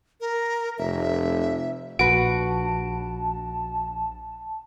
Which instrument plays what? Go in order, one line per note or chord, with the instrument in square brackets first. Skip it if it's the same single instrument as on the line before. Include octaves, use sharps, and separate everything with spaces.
[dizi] A#4
[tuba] F1 [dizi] E5
[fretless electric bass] A#1 [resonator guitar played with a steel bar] F#4 B4 [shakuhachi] A5 [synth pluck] D7